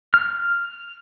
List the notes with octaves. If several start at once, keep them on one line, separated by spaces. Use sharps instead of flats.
F6